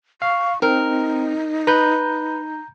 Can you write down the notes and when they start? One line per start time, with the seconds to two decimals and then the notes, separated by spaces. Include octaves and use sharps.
0.22 F5 C#6
0.62 C4 D#4 A#4
1.67 B4 A#5 G6